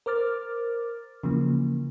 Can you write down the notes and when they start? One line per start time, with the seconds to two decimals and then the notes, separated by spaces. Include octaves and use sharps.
0.06 A#4 C5 D6 F6 A6
1.23 C#3 E3 F3 A#3